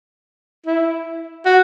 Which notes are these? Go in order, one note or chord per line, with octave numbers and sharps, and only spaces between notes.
E4
F#4